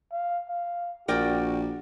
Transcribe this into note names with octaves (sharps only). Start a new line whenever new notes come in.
F5
F5
A#1 F#4 A#4 D5 G5